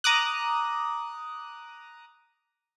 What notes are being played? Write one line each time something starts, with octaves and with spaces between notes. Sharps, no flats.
A#5 D6 D#6 F#6